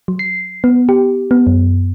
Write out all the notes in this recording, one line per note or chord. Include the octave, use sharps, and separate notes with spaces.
F#3
C7
B3
G4
B3
F#2